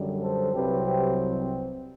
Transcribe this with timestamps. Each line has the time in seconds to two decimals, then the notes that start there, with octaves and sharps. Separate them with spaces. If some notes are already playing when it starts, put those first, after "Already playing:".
Already playing: F#2 D3 G3
0.21 A4 C5
0.53 C2 C3 F#3 C4 G4 B4
0.84 G4 B4